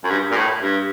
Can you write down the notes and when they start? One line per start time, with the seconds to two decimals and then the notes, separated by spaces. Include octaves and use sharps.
0.04 F#2
0.10 G2
0.31 A#2
0.37 A2
0.62 G2